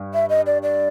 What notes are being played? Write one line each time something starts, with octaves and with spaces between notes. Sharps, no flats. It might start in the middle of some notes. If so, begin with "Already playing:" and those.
Already playing: G2
E5
D#5
D5
D5